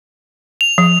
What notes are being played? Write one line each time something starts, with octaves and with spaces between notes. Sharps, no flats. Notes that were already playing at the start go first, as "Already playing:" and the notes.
F7
F3